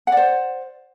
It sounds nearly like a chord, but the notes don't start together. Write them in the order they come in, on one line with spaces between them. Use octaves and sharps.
F#5 D5 C5